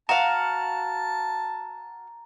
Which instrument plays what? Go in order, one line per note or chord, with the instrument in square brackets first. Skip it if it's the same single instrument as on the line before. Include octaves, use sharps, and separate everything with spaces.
[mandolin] F#4 F5 [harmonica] A5 [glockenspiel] A#5